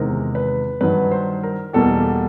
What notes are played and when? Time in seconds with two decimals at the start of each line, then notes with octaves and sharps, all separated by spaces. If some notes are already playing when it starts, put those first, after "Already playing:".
Already playing: E2 C3 D#3 G#3 A#4
0.35 B4
0.81 G2 D#3 F#3 B4
1.11 C5
1.43 A#4
1.73 E2 B2 G3 A#3 A4